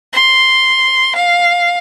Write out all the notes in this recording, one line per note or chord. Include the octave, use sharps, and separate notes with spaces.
C6
F5